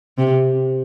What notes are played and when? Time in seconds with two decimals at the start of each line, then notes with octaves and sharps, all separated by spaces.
0.18 C3